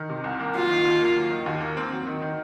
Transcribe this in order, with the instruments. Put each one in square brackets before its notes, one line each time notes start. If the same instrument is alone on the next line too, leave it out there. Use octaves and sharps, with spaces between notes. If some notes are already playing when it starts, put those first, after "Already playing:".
Already playing: [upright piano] D#3
C3
C2
A#3
[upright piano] F#3 [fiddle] F4
[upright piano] D#3
D#2
A#3
F#3
D#3
D#2
A#3
C4
F#3
D#3
D#3